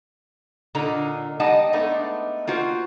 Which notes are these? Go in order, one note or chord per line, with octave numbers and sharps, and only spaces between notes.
A#2 D3 D#4 A#5
G3 A#3 D#4 D#5 F#5 A5
G#3 A3 B3 D4 D#4
A#3 F4 F#4 C5